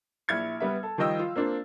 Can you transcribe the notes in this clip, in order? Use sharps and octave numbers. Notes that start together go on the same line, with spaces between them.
A#1 E4 F6 G#6 C#7
G3 B3 B4 E5
A4
D#3 F3 G3 D#5 G5 E6
F4
A#3 C4 D4 F4